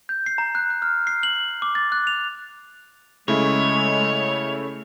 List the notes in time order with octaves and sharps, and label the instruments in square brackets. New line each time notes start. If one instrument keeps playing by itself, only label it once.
[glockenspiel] G6
C7
A#5
F#6
F#6
F6
C7
F#7
D6
A6
F#6
F7
[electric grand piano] C#3 A3 E4 [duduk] G#3 [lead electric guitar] C#5